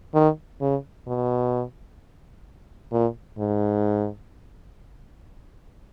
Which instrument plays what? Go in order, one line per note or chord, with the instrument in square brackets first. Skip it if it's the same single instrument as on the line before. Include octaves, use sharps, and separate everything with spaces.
[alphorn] D#3
C#3
B2
A#2
G#2